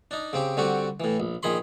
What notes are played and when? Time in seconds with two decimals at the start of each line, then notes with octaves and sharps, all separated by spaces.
0.11 D4 D#4
0.33 C#3 C4 G4
0.57 D3 G3 C4 F#4 G4
1.00 A2 E3
1.20 A#1
1.43 A#1 D#3 G#4 B5 C6